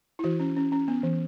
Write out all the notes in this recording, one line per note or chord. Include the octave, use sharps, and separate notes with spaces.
E4
E3 F#4
C#4
C#4
C#4
B3
E3